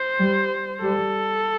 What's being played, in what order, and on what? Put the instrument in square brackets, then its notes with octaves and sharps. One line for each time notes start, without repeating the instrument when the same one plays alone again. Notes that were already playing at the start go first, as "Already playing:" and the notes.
Already playing: [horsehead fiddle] C5
[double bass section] G3
[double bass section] G3 [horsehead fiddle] A4